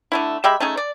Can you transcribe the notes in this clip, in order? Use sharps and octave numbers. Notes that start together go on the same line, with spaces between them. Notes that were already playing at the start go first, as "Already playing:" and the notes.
D3 A3 E4
G#3 G4 E5 B5
A3 C#4 D#4 G#4
D5